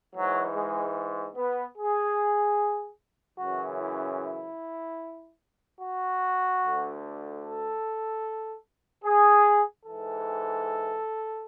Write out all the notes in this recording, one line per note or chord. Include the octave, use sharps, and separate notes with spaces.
G#2 E3 F#3
G#3
B3
G#4
F#2 C#3 E3 F#4
E4
E4
F#4
D2 D3
A4
G#4
G#2 E3 A4